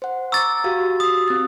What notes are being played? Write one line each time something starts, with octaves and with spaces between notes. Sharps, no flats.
C5 F#5
A#5 C#6 D6 E6 A6
F#4 G4 F5
D#6
C4 A6